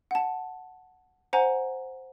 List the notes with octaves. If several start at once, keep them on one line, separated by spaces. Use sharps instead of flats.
F#5 A5
C5 F#5 G#5 A#5